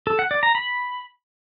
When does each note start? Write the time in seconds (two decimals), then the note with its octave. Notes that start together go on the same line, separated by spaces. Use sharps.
0.07 A4
0.19 F#5
0.31 D5
0.43 A#5
0.55 B5